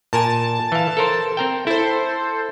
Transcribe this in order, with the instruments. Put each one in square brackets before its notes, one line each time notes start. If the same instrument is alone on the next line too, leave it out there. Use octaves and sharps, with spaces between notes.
[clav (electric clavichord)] A#2 A#4 G#5 [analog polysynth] A5
[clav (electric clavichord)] E3 F5
A4 A#4 C5
C4 A#4 G5
[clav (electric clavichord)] E4 [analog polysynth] A4 C5